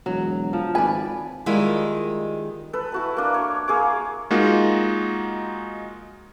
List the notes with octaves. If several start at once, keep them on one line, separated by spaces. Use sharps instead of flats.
E1 F#3
F3
G#1 B4 D5 G#5
D#3 G3 G#3 A#3 E4 F4
A4 B4
E4 F#4 A5
A#3 D4
C#5
A#3 G#4 C#5 D6
G#3 A#3 D#4 F4 F#4